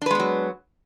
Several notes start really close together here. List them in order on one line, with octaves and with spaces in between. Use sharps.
D4 B4 G#3 B3 F#3